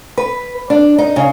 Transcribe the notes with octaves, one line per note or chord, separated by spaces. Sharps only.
B4
D4
D#4
C#3